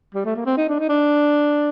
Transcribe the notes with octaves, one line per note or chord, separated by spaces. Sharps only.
G3
A3
A#3
C4
D#4
D4
D#4
D4